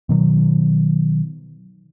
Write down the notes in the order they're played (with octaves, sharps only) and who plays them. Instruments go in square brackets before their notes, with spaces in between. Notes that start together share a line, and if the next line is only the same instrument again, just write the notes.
[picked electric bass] B2 D#3 F#3